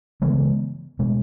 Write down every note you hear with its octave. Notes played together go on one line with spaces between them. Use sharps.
C#3 E3 G#3 B3
B2 G#3